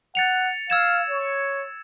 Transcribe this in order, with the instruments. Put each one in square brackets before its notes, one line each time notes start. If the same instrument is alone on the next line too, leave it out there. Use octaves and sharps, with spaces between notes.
[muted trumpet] F#5 [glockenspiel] A6 C#7 F7
[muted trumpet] F5 [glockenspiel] E6 G#6 E7
[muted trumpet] C#5